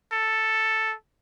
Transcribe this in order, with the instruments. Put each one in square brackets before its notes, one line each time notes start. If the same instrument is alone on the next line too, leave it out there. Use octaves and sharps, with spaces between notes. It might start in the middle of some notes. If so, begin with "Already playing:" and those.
[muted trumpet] A4